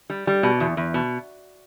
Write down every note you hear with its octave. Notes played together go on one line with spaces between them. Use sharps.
G3
G3
B2
E2
E2
B2